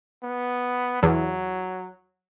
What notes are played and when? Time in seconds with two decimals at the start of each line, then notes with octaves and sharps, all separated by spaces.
0.24 B3
1.03 E2 F#3